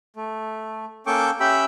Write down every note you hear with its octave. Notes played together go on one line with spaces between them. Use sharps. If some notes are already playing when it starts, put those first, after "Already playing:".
A3
A#3 C#4 A4 G5 C#6 D6
C#4 G4 E5 G5 B5 E6